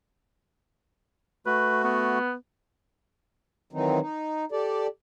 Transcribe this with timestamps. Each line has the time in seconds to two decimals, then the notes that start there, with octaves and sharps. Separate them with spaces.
1.46 A3 F#4 B4
1.84 B3
3.73 D#3 E3 F#3 C4 D#4
4.00 D#4
4.52 G4 A4 D5